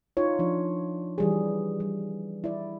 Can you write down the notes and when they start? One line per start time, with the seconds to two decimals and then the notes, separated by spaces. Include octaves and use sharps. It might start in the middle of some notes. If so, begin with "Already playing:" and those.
0.17 D#4 F4 C#5
0.39 F3 D4
1.18 E3 G3 G#4
1.80 G3
2.44 E4 D5